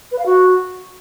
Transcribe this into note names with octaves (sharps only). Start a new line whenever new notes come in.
B4
F5
F#4